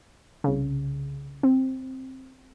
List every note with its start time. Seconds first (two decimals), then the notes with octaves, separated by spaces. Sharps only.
0.44 C2 C#3
1.43 C4